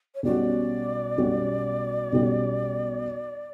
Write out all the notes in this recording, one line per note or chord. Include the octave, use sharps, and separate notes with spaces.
C#5
B1 B2 G3 C#4 F#4 D5
B1 B2 G3 C#4 F#4
B1 B2 G3 C#4 F#4